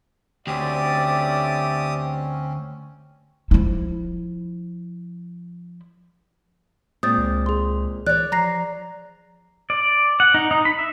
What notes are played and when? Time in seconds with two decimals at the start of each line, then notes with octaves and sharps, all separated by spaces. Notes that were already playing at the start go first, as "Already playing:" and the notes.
0.47 D2 C4 C#4 G4 D5 E5 D#6
3.51 F3 E4
7.03 A#2 G#3 C4 D#6 G6 A6
7.18 C#2
7.46 G#4 C6
8.07 E3 C#5 D5 F#6
8.32 F3 A#5 A#6 C7
9.70 D5
10.20 F#5
10.34 D#4
10.51 D#4
10.65 B5
10.79 E5